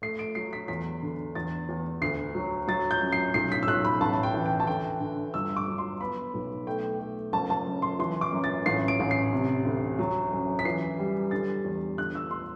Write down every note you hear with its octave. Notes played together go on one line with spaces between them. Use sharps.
A3 C7
D7
F#3 C7
B6
E2 B6
D3
E2 A6
E2
D2 C7
F#3
F#3 A6
G6
F#2
C7
B1 C7
B6
E6
B1 F#6
B5
A1 A5
A5
G5
E3
G5
A5
D3 G5
D3
G1 E6
D6
F#3
C6
B3 B5
B1
A3 G5
A3
F#1 A5
A5
F#2
C6
E3 C6
D6
F#2
A6
A1 C7
D7
A1
C7
C3
D2
F#3
F#2
B6
E3 C7
G3
D3 A6
E2
D3 F#6
E6
C6